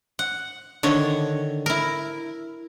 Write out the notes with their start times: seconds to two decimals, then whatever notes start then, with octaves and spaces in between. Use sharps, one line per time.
0.19 F#5
0.83 D3 D#3 C#5
1.66 E4 A#4